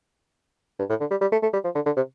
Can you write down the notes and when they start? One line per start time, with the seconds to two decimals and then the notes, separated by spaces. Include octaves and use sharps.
0.79 G2
0.90 A2
1.00 D3
1.11 G3
1.21 G3
1.32 A3
1.43 A3
1.53 G3
1.64 F3
1.75 D3
1.86 D3
1.97 C3